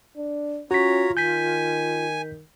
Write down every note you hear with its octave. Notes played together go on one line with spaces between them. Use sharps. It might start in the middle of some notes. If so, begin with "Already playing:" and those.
D4
C#4 F4 F#4 C#5 A#5 B6
D#3 G#5 G6 B6